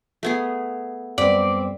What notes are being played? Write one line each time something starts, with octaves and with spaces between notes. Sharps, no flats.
A3 B3 G#4
F#2 G3 B3 C4 D5 B5